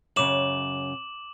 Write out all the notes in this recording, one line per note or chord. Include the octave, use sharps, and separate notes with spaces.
F#2 C#3 D6 E7 F#7